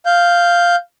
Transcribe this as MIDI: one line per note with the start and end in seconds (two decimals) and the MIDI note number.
0.06 0.76 77
0.06 0.76 91